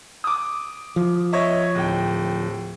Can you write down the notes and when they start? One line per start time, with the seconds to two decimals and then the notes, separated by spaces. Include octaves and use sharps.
0.24 D6 D#6
0.96 F3
1.32 C#5 D#5 E5
1.75 D1 G5